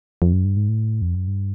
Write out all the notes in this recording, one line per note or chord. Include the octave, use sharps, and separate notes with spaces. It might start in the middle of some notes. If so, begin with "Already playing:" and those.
F2
F#2
G2
G#2
A2
F2
F#2
G2